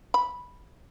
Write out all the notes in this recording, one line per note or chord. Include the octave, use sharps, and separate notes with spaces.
B5